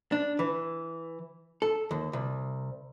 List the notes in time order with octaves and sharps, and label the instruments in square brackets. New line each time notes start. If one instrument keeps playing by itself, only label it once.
[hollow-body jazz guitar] D4
E3
A4
D#2
C2